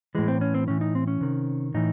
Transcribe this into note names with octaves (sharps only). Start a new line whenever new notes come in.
A2 E3 G#3
C4
C#4
C4
A2 E3 C#4
D#4
C4
C#4
C3 D#3
A2 E3 D#4